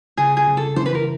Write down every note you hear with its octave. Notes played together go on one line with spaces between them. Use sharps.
C#3 G#4
G#4
C#3
A4
E3 C5
B4
A#4